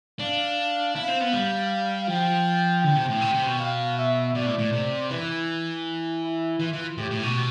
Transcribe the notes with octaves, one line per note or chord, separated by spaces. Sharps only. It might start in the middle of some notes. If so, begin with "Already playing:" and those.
D4 F5
E4 F5
C4
B3
G3
F3 G5
D3 G5
C3
A2
C3
C3
B2
F5
E5
B2 D5
A2
A2
C3
E3 B4
E4
E3 F4
E3
A2 G4
A2
B2